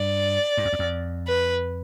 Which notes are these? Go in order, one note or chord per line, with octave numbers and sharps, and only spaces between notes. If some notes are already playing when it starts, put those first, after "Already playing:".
Already playing: G2 D5
G2
F2
E2
F2
B4